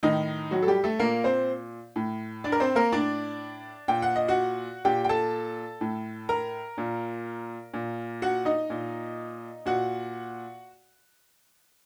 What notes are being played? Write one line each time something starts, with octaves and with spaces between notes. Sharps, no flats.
A2 D#3 D#4
F#3 F#4
A4
G3 G4
A3 A4
A#2 A#3 A#4
C4 C5
A2
D4 D5
A#4
C4 C5
A#3 A#4
A2 D4 D5
A#2 G5
F#5
D#5
F#4 F#5
A#2 G4 G5
G5
A4 A5
A2
A#4 A#5
A#2
A#2
F#4 F#5
D#4 D#5
A#2
A#2 F#4 F#5